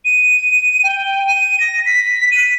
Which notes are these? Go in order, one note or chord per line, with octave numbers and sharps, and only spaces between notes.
D#7
G5
D#7
A#6
B6
D#7